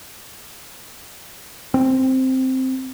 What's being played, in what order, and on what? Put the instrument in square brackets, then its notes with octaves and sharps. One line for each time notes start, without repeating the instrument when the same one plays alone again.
[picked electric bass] C4